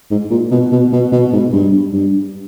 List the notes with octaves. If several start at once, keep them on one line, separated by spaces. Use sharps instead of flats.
G#2
A#2
B2
B2
B2
B2
G#2
G2
G2